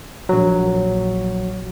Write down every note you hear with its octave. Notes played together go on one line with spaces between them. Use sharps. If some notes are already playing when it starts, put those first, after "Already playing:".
A#1 F#3